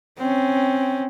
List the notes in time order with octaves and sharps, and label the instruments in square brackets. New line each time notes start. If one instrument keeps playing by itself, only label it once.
[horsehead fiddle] C4 C#4